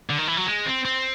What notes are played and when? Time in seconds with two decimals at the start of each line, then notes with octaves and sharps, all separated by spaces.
0.10 D3
0.18 D#3
0.28 E3
0.37 F#3
0.47 G#3
0.66 C4
0.85 C4